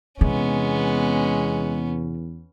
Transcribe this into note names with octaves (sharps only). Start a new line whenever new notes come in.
E2 C3 G#3 B3 C#4